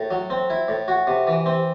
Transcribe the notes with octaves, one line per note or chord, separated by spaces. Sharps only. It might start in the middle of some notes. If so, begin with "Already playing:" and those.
Already playing: A2
F#3
C4
E4
A2
F#4
C3
E3
C4